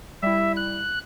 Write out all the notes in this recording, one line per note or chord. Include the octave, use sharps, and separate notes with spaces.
G3 E4 E5
F#6